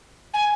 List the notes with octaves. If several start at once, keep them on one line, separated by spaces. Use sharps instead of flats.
G#5